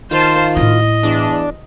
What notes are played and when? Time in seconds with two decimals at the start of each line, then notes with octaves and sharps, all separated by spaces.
0.11 D#3 F4 C5 A5
0.57 A2 E4 D#5
1.03 E2 D4